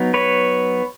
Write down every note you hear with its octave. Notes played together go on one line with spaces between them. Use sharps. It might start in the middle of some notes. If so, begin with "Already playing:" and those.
Already playing: F#3 B3 D#4
B4 C#5